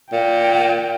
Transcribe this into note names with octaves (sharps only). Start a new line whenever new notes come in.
A#2 G5